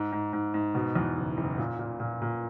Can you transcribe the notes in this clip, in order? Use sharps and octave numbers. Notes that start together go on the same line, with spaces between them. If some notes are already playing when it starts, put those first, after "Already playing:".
Already playing: G#2
G#2
G#2
G#2
B2
E2
F#1
F#1
A#2
A#2
A#2
A#2